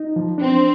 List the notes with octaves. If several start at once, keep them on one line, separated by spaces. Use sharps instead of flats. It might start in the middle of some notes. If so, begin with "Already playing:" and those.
Already playing: D#4
F3
C4 D4